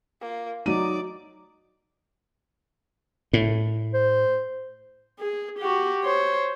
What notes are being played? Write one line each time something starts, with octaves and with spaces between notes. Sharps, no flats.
A#3 F4
F#3 D#4 D5 D6 D#7
A2
C5
G#4
F#4 G4
C5 C#5